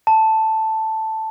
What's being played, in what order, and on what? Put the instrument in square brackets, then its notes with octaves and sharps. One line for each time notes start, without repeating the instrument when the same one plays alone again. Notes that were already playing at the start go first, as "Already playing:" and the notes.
[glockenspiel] A5